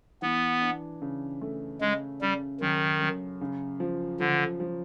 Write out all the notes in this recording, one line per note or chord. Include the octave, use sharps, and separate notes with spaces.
E3 B3
D4
C#3
A3
C#3 G#3
C#3 G3
F#2 D#3
F#2
C#3
F3
D3 F3
F3